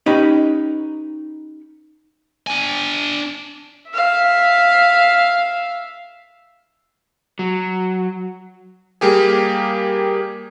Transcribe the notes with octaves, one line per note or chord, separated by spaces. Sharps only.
C#4 D#4 G4 B4 B5
D4 G#5
E5 F5
F#3
G3 A#3 G4 G#4